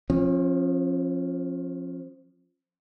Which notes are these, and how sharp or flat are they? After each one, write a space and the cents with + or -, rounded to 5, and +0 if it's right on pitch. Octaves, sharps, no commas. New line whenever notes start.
F3 +0 C#4 -40